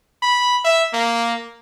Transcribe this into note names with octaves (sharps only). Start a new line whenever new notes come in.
B5
E5
A#3